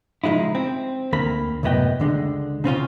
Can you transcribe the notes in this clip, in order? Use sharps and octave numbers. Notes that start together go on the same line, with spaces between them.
C#3 F3 G#3 D#4 E4
C4
D2 A#3 B5
C2 F#2 A2 B3 D#5 G5
C#2 D3 G#3
C#3 C4 C#4 F4